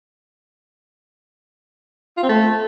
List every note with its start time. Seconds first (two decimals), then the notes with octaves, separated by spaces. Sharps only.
2.17 F4
2.23 C4
2.29 A3